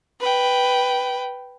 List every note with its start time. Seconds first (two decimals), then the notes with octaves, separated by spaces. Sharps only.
0.20 B4 G5